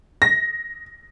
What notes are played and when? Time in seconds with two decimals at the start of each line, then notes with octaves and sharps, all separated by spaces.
0.22 A#6